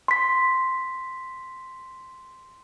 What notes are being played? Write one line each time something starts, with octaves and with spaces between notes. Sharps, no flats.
C6 B6